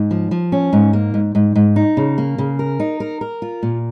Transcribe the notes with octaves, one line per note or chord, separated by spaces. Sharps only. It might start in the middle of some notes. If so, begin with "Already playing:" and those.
Already playing: G#2
F3
F3
C#4
G#2
A#3
G#2
G#2
G#2
D#4
C#3
A#3
C#3
A#4
D#4
A#4
A#4
F4
A#2